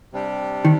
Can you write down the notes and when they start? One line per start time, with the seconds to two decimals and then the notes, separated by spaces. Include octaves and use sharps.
0.13 C3 G3 D4 G4
0.65 D#3